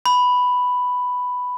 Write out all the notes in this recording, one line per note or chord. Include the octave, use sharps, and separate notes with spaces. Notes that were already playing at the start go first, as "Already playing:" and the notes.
B5